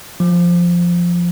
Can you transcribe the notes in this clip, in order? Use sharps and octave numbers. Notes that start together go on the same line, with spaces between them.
F3